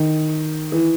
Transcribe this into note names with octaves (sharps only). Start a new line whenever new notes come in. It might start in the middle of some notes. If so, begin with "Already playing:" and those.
Already playing: D#3
E3